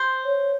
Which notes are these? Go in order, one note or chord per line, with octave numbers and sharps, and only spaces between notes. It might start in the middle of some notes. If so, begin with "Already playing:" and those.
Already playing: C5
C#5